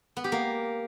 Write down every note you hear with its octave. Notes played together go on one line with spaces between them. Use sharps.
B3
G4
A#3